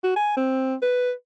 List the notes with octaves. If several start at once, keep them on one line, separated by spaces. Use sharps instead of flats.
F#4
G#5
C4
B4